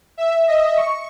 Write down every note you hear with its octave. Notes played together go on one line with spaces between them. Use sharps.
E5
D#5
C#6